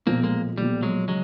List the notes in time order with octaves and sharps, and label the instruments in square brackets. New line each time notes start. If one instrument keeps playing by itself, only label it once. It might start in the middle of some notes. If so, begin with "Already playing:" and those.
[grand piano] B1 A#2 F3 [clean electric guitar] A#3 C4
[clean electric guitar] G#3 A#3
[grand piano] B1 A#2 F3 [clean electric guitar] G3
[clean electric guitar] F#3 G#3
[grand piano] C#3 [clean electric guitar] F#3 G#3